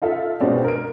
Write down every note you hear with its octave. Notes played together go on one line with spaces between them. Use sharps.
D#4 F4 A4 E5
B2 G#3 B3 C4 D4
A#4 D7